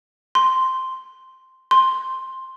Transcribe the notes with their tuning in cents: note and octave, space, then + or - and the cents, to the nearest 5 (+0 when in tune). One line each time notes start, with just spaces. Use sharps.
C6 +0
C6 +10